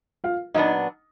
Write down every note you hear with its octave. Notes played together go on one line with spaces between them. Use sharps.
F4 F5
A#2 F#3 B3 D4 D#4 D#5